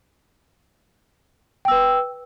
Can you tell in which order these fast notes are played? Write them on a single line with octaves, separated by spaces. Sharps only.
G5 E6 B4